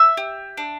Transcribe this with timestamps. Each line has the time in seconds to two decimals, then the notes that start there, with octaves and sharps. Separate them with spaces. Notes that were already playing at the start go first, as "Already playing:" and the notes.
Already playing: E5 E6
0.17 G4
0.57 D4